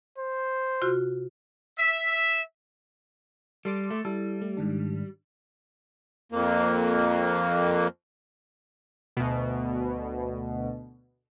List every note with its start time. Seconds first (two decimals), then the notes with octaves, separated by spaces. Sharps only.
0.18 C5
0.82 C3 F4 F#4
1.78 E5
3.65 G3 A4 C6 D6
3.91 A3
4.05 G3 E4 A4
4.42 A3
4.57 G#2 D#3 D4
6.32 F2 A#3
9.17 D2 B2